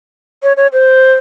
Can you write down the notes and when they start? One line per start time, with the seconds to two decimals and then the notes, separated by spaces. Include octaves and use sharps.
0.43 C#5
0.57 C#5
0.73 C5